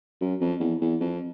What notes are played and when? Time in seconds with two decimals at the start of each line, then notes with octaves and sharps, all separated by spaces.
0.21 F#2
0.41 F2
0.60 E2
0.81 E2
1.00 F2